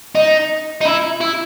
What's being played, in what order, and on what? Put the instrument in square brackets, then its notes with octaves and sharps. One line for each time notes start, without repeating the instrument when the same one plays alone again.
[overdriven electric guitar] D#4
D#4
E4
E4